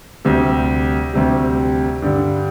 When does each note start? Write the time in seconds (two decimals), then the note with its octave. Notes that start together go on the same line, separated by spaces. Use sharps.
0.25 D2 C3 G3
1.14 D2 C3 G3
2.02 G2 D3 G3